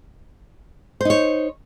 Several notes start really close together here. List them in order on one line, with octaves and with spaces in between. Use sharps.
C5 D#4 C#5